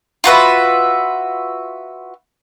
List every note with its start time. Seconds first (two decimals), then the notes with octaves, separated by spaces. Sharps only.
0.24 F4 F#4 B4 E5